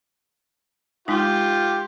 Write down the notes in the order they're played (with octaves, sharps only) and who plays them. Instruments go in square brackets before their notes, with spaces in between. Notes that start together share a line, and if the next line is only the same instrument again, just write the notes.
[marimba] G#3 D#4 [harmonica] F4 G4